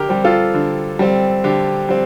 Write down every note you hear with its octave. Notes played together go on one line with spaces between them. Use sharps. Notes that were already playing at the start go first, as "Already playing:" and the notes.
Already playing: D3 G4 A#4
G3 C4
F4 A4
D3
G3 C4
D3 G4
G3 C4